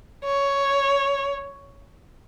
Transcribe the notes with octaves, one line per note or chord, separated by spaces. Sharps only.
C#5